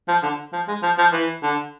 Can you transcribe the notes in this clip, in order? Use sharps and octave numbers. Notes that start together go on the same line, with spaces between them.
F3
D3
F3
G#3
F3
F3
E3
D3